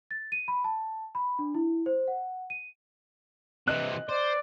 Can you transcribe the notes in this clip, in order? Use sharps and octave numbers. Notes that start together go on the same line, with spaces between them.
A6
D#7
B5
A5
B5
D4
E4
C5
F#5
D#7
C3 E3 D#5 F#6
C5 D5